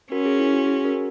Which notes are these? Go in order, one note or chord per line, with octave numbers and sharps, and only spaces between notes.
C#4 F#4 A#4
G#4
E4
F#4
G#4
F#4 A#4